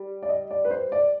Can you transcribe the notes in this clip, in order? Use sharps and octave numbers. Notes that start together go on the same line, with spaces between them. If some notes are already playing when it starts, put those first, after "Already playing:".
Already playing: G3
D5
D#5
D5
B4
C5
D5